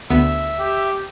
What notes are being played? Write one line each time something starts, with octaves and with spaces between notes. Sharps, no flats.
D2 B3 E5
G4